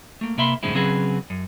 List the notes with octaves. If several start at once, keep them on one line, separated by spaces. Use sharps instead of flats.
A3 A#3
C3 A#3 E5 B5 C6
F#2 A2 D3 G#3 C4 E4
C#3 F#3 C4 C#4 G#4 B4
F#2